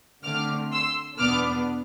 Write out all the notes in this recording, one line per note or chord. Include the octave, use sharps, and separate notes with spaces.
D3 A3 C4 D6 F6
C6 E6
E2 B2 B3 D4 D6 F6